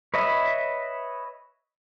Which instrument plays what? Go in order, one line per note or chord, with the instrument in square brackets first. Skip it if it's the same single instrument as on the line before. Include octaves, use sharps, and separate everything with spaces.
[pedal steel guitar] B4 C#5 D#5 E5 B5